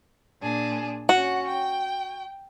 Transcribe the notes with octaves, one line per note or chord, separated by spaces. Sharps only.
A#2 D4 G#4
C#4 F#4 F#5
G5